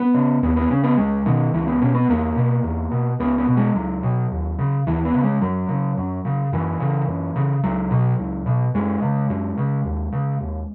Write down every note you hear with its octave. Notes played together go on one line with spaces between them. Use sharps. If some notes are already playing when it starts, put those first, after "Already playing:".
Already playing: B3
C#3
D#2 B3
B3
C#3 C#4
B3
C#2 G#3
B2 D#3
C#2 E3
B3
B2 C#4
B3
E2 A#3
B2
E2
B2
C#2 B3
B3
B2
G#3
C#2 F#3
B2
D#2
C#3
D#2 E3
B3
C#3
G#3
F#2 F#3
C#3
F#2
C#3
F#2 E3
C#3
F#2
C#3
C#2 F#3
B2
C#2
B2
F#2 G#3
C#3
F#2
C#3
D#2
C#3
D#2